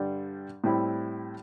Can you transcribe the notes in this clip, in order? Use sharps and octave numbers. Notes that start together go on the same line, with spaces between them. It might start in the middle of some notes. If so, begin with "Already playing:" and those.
Already playing: G2 D3 G3
A2 G3 C4 E4